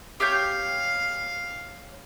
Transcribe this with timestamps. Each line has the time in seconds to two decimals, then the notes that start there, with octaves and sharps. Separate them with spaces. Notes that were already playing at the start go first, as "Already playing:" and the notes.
0.20 G4 C#5 F5 G6